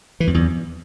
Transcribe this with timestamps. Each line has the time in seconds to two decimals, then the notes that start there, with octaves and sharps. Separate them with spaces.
0.20 E3
0.27 F2
0.34 E2